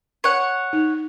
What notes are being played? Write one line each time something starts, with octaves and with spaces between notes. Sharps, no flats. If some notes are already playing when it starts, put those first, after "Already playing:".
C#5 F#5
D#4